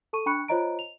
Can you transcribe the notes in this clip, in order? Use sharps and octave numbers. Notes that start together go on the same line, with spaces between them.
A4 A5 C#6 D#7
D4 G5 B5 C#6 F#6 C#7
F4 C5 C#5 D#5 A#5 D7
F7